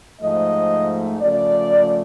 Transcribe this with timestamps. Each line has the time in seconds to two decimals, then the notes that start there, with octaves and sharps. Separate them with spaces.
0.20 G#2 F3 A3 D#5
1.20 C#3 F3 A3 D5